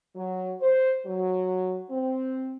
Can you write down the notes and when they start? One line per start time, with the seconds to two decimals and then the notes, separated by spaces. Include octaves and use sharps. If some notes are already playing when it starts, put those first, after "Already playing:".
0.16 F#3
0.61 C5
1.06 F#3
1.90 C4